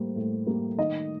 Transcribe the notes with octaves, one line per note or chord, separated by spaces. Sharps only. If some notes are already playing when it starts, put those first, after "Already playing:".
Already playing: A2 G3 A#3 C5
A2
G3 A#3
D#3 D#5